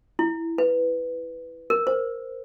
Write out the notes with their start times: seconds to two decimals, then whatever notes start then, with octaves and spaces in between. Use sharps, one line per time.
0.19 E4
0.58 B4
1.70 A#4
1.87 C5